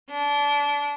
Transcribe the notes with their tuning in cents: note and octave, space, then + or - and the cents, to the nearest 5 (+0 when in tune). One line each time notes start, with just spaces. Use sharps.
D4 -25